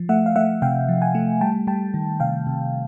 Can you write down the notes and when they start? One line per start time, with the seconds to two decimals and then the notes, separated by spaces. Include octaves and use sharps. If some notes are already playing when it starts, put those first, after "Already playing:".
Already playing: F3
0.09 A3 E5 F#5
0.26 F5
0.36 A3 E5 F#5
0.62 C3 F5 G5
0.88 F3
1.01 F#5 G#5
1.15 A3
1.41 G3 G5 A5
1.67 G3 G5 A5
1.94 D#3
2.20 C3 F5 G5
2.47 C3